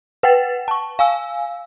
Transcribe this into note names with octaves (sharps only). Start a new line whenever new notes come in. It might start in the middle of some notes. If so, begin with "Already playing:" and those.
B4 F#5 G5 A6
A5 C#6
F5 G#5 E6